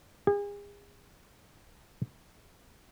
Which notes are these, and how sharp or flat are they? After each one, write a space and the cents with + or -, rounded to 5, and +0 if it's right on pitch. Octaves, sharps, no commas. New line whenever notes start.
G#4 -40